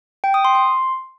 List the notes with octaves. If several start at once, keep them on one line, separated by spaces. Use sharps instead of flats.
G5
D#6
C6
C6